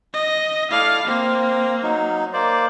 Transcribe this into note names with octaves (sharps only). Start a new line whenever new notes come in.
D#5
A3 E4 D5 F5
A#3 C4
F#3 D#4
A#3 C5 D5